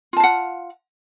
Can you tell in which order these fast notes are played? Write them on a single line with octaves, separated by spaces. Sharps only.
F4 A5 F5 F#5